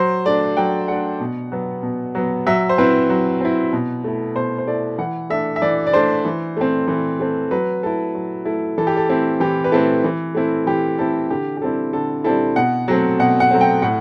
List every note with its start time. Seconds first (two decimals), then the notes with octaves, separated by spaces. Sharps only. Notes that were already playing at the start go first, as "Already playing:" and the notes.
Already playing: F#3 C5
0.26 A3 D4 D5
0.57 F#3 G5
0.88 A3 D4 F#5
1.20 B2
1.52 F#3 B3
1.83 B2
2.15 F#3 B3
2.47 F#3 E5
2.69 C5
2.78 C4 E4 B4
3.10 F#3
3.41 C4 E4
3.73 B2
4.04 A3 E4
4.35 B2 C5
4.58 C5
4.67 A3 E4 D5
4.98 E3 F#5
5.30 A3 D4 E5
5.56 E5
5.62 E3 D5
5.87 D5
5.93 A3 D4 C5
6.25 E3
6.57 A3 C4
6.88 E3
7.20 A3 C4
7.51 F#3 B4
7.83 A3 E4 A4
8.15 F#3
8.45 A3 E4
8.78 E3 A4
8.87 G4
8.97 A4
9.09 A3 C4 E4
9.40 E3 G4
9.64 B4
9.72 A3 C4 E4 A4
10.04 E3
10.35 A3 C4 E4
10.66 E3 G4
10.98 A3 C4 E4 A4
11.30 D3 G4
11.57 G4
11.62 G3 C4 E4 A4
11.93 D3 A4
12.24 G3 C4 E4 A4
12.56 B2 F#5
12.88 F#3 A3 C4
13.19 B2 F#5
13.40 F#5
13.51 F#3 A3 C4
13.61 G5
13.82 A2 F#5